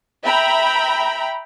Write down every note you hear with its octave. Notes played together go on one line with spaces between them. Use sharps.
E5 G5 A#5 B5